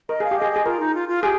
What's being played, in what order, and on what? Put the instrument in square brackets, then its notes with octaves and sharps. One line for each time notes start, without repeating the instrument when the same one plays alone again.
[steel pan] A#4 [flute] D#5
[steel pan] G#4 [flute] F5
[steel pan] G4
[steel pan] G#4 [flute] D#5
[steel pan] G#4 [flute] D#5
[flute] F4 [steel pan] A#4
[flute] D#4
F4
F4
[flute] G4 [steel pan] G#4